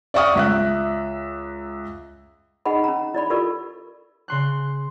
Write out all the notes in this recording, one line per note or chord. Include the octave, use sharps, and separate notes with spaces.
D5 E5 F#5 C#6 D#6 F6
C#2 E5 F#6
D#4 G#4 D#5 F#5 B5
C#4 A#5
E4 D5 B5
F4 G4 A4 A#4 D5
C#3 C6 F#6